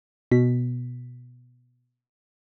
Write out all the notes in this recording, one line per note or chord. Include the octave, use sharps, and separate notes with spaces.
B2 B6